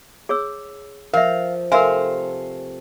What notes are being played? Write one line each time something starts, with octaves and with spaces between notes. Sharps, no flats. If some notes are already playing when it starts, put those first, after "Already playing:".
G#4 C#5 E6
F3 A#4 E5 F5
C3 A3 A#4 C5 E5 F5 G#5 A#5